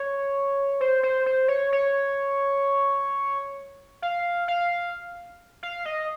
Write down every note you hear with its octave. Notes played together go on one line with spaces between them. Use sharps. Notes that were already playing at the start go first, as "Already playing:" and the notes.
Already playing: C#5
C5
C5
C5
C#5
C#5
F5
F5
F5
D#5